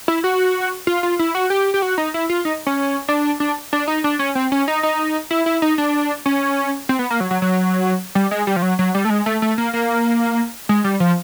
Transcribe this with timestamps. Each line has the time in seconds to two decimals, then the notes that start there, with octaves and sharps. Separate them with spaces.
0.08 E4
0.24 F#4
0.87 F4
1.03 F4
1.19 E4
1.35 F#4
1.50 G4
1.74 G4
1.82 F#4
1.98 D#4
2.14 E4
2.29 F4
2.45 D#4
2.67 C#4
3.08 D4
3.40 D4
3.73 D4
3.88 D#4
4.04 D4
4.19 C#4
4.35 C4
4.52 C#4
4.68 D#4
4.83 D#4
5.31 E4
5.46 E4
5.62 D#4
5.78 D4
6.26 C#4
6.89 C4
6.99 B3
7.10 A#3
7.20 F#3
7.31 F#3
7.42 F#3
8.15 G3
8.31 G#3
8.47 G3
8.56 F3
8.62 F#3
8.79 F#3
8.95 G3
9.05 A3
9.10 G#3
9.26 A3
9.42 A3
9.58 A#3
9.73 A#3
10.69 G#3
10.84 G3
11.00 F3